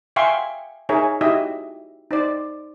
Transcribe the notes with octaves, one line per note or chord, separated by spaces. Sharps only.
E5 F5 G5 G#5 C6 C#6
D#4 G#4 A#4 C#5 E5 G#5
D#4 E4 F#4 G4 D#5 E5
D#4 C5 D5